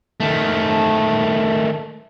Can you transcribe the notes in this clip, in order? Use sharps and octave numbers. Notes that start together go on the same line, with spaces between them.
D#3 A3